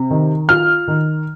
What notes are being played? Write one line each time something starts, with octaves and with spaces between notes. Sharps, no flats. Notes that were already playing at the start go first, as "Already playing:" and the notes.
Already playing: C3
D#3
F4 F6
D#3